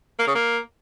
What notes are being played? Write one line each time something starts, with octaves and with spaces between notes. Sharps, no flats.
A#3
C#3
A#3